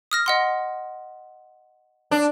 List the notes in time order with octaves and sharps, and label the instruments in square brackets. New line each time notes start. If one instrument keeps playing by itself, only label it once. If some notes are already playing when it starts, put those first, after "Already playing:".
[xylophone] D#6 F6 A#6
D#5 F#5 C6
[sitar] D4